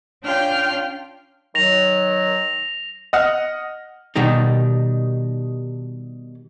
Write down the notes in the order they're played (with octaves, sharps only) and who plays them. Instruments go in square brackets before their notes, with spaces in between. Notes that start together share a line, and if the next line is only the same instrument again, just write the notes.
[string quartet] C#4 D4 F4 G5 F6 G6
[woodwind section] D#3 F#3 [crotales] A#6 F7
[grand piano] D#5 F#5 F6
[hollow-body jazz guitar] B2 D#3 G3 D#4